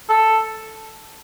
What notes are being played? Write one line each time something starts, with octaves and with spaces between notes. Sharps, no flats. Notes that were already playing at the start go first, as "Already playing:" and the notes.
A4